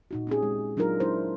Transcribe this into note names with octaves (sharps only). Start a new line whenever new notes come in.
A#2 D#4 F#4
C4 C#4 G4 G#4
G#3
F#3 D4 D#4 F4 A#4
G#3 D4 E4 C5